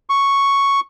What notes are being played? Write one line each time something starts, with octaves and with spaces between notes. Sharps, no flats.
C#6